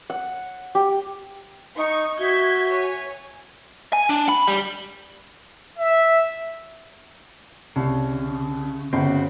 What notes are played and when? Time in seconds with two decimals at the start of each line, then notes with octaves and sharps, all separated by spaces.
0.10 F#5
0.75 G4
1.76 D#4 C#6
2.19 F#4 E5 G6 G#6
2.70 C#5 G#5
3.93 G#5
4.09 D4
4.29 B5
4.48 G3
5.78 E5
7.76 C2 C#3
8.93 G1 C#3 C4 F#4